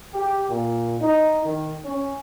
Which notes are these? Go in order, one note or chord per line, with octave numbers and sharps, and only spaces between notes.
G4
A#2
D#4
D#3
C#4